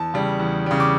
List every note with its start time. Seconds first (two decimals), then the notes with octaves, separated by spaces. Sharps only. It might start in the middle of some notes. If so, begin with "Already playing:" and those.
Already playing: E2 A5
0.14 C#3 G3
0.39 E2
0.66 C#3 G3
0.80 D6